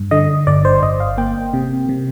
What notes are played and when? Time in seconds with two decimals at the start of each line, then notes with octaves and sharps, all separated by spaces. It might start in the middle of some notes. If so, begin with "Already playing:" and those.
Already playing: G2
0.11 D3 D#5
0.47 G1 D5
0.65 C5
0.83 G1 D#5
1.00 F5
1.18 A#3 G5
1.53 C3
1.89 C3